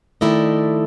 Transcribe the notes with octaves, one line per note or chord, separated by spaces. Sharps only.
D#3 F3 A3 E4 D5 D#5